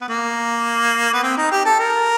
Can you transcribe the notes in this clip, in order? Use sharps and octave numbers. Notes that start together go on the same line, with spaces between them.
B3
A#3
B3
C4
D#4
G4
A4
A#4